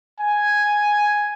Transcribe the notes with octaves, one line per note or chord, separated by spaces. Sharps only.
G#5